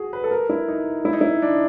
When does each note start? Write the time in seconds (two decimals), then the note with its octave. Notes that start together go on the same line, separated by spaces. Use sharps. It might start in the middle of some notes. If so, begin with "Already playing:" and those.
Already playing: F#4 G#4
0.13 B4
0.24 A4
0.31 A#4
0.50 E4
0.68 D#4
1.05 E4
1.13 D#4
1.21 E4
1.42 D4